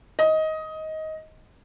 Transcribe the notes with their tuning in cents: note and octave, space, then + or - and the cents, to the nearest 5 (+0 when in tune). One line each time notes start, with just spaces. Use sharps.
D#5 +15